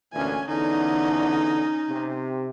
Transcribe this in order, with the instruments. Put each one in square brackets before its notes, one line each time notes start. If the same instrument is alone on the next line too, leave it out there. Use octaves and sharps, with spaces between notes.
[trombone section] D2 A#2 E3 [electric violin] C#4 G#5
[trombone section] E2 D3 [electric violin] C#4 D#4
[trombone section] C3